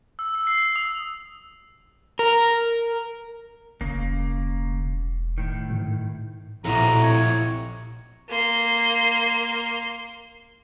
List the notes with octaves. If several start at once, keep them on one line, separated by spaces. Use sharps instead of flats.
E6
E6
C7
D#6
A#4
E1 C#3 A#3
A2 D#3
G#2
A#1 F2 A2 C3 E4 F#4 A#5
C#5
A#3 C6